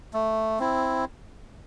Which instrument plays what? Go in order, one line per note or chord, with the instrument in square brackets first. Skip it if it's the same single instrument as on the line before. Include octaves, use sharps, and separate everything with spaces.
[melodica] A3
C4 E4